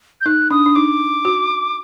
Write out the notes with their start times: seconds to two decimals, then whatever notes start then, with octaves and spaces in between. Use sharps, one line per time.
0.21 G6
0.26 D#4 F#6
0.50 D4 D#6
0.66 D4
0.75 D#4 D6
1.25 F#4